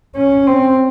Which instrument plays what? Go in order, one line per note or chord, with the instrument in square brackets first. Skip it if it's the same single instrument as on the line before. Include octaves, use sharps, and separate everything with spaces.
[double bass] C#4
C4